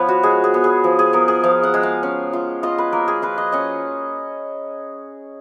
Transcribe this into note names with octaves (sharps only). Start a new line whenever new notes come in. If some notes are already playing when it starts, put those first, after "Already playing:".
Already playing: F3 B3 B4 C#5
F#4
G#3 G#4
G#4
B3
G#4
F3
G#4
B3 A#4
G#4
F3 F5
F#5
G#3
F5
C#4
F4
F4 D#5
B4
A#3 A#4
G#4
F4 B4
D#5
C#4 D#5